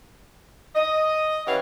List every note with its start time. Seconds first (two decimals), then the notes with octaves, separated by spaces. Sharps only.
0.75 D#5
1.46 E3 C#4 G4 F5 F#5